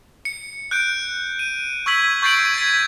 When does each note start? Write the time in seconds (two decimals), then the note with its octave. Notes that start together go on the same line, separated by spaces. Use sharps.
0.25 C#7
0.71 F#6 G6 D7
1.39 D#7
1.86 C#6 E6 G#6 B6 F#7
2.22 C#6 G6 A6 C7 D7 F#7
2.54 G#6 B6